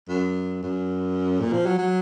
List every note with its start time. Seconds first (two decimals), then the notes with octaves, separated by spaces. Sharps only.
0.09 F#2
0.63 F#2
1.40 A#2
1.53 F3
1.66 F#3
1.78 F#3